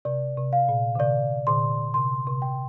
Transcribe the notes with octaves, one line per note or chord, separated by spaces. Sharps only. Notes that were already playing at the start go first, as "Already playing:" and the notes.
C3 D5
C3
F5
A#2
D3
C3 D5
A#2 D3 C6
C3 C6
C3
G5